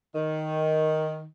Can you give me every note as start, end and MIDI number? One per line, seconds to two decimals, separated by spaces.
0.15 1.24 51